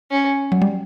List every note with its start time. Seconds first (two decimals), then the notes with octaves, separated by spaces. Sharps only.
0.11 C#4
0.52 F#3
0.62 G3